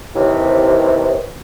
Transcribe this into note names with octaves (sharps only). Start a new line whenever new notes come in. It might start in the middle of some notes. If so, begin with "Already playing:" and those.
D#2 C3 E3